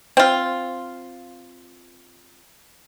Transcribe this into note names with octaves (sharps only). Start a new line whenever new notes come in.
C4 F4